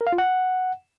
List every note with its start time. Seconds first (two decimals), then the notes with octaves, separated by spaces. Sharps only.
0.01 A#4
0.07 F5
0.13 F4
0.18 F#5